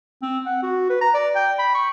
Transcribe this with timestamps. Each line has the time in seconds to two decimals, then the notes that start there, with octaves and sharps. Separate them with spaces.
0.22 C4
0.46 F#5
0.63 F#4
0.90 B4
1.01 A#5
1.14 D5
1.35 G5
1.59 B5
1.75 C#6